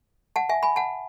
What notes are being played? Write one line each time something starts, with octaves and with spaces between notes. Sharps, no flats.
F#5 A5
E5 G#5
G#5 B5
F#5 A5